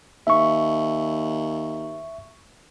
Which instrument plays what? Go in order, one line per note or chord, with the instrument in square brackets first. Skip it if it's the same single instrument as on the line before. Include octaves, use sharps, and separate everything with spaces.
[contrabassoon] D#2 [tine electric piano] E5 C#6